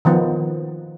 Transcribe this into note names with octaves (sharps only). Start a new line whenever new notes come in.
D#3 F3 B3